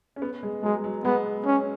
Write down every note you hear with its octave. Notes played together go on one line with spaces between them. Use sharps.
C#4
B3
G#3
F#3 G#3
F#3
G#3 B3
C#4